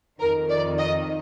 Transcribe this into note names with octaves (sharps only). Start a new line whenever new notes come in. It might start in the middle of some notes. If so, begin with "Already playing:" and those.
F2 D#3 A#4
D5
D#5